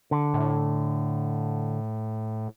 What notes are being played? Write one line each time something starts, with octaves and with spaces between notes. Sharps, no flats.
D3
A2